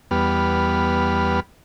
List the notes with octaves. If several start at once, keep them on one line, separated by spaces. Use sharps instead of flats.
E2 G3 B3 G4 B5 F6